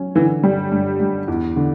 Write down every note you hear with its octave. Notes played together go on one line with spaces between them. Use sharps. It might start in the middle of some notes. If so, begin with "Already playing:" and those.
Already playing: F#3 C#4
D3 E3
G2 G3
G2
G2
E2
D3